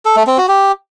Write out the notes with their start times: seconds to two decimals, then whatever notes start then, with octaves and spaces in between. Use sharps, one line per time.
0.05 A4
0.16 A3
0.27 C4
0.38 F#4
0.48 G4